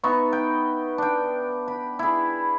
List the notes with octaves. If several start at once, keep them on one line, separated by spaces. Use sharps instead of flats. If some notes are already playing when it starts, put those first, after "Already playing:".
B3 D#4 E5 C#6
G5
D4 G5
B5
E4 G#4